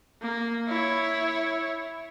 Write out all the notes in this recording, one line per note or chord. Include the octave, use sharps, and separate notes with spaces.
A#3
E4 C#5